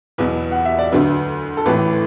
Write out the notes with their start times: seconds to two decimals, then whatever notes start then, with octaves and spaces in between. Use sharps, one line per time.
0.18 E2 B2 F#3 B4
0.52 F#5
0.65 E5
0.79 D5
0.92 D2 D3 F#3 B4
1.57 A4
1.66 A1 A2 E3 B4